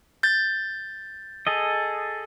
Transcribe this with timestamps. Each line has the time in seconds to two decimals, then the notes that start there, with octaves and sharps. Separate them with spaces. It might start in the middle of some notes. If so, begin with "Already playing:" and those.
0.23 G6 A6
1.47 G#4 A4 D#5